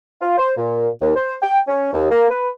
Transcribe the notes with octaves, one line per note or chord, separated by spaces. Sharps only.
F4
C5
A#2
D#2
C5
G5
C#4
D#2
A#3
B4